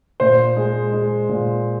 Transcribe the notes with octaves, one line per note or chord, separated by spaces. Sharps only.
A#2 C5
G#3
G#3
A#2